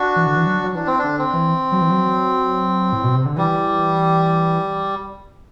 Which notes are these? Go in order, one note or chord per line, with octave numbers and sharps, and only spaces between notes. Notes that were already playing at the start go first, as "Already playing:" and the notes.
Already playing: D4 F#4
E3
D3
E3
F#3
F#3
E3 D4
C4
D4
D3
C4
E3
F#3
E3
F#3
A2
B2
C3
D3
E3 G3